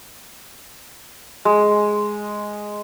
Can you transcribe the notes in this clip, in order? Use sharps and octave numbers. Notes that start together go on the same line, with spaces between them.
G#3